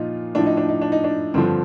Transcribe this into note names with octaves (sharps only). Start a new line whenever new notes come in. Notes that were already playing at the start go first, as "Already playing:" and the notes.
Already playing: A#2 F3 D#4 F4
A2 F3 D4
D#4
D4
D#4
D4
D#4
D4
G2 D3 F3 C4